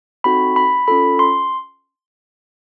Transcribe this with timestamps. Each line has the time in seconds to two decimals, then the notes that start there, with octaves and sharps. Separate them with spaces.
0.24 C4 D#4 F#4 A4 B5
0.56 B5
0.88 C#4 F4 A4 B5
1.19 C6